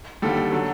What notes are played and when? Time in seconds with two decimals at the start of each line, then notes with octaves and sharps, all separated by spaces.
0.22 D#2 D3 G3 A4
0.52 D3 F#3